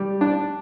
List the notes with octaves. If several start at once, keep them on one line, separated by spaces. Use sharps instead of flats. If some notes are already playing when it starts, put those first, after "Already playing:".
Already playing: G3
D4